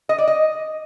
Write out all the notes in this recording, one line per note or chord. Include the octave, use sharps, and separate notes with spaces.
D#5
D5
D#5